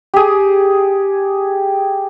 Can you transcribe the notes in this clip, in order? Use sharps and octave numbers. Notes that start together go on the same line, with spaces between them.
G4 G#4